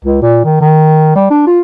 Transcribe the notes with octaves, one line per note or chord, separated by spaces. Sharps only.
C#2
A#2
D#3
D#3
G3
D4
F4